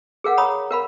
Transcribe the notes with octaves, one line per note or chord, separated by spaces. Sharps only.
G#4 A#4 F5 F#5
C#5 A#5 B5 D#6
A#4 F5 B5